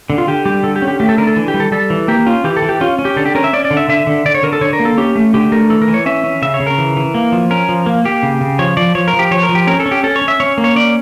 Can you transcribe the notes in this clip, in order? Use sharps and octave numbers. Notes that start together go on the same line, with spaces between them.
D3
F4
D3 G4
G3 G4
D3 A4
G4
C#4
G4
A3 G4
A4
D3 A#4
A4
E3
G4
G3
A4
G3 A4
E3
A#3 G4
C#4 F4
E3 G4
A4
E3
G4
C#4 F4
C#4
G4
D3 A4
G4
C#4 A#4
E5
C#4 D5
D5
D3
E5
D3 E5
D3
D3 D5
C#5
D3 A#4
A4
D3 C#5
A#4
A#3
A4
C#4 G4
A3
D3 G4
A3 A#4
E3 A4
A#4
E3
C#5
C#4 E5
C#4
C#3 E5
C#5
C#3
A#4
E3
E3
A#3
F3
C#4 A#4
F3
A#3
A#3 G4
C#3
C#3
F3 C#5
F3 D5
F3 C#5
A#4
F3
G4
F3 C#5
A#4
F3
G4
C#4 A#4
A4
C#4
G4
C#4 A4
C#5
C#4
E5
C#4 C#5
A#3
C#5
C#4 D5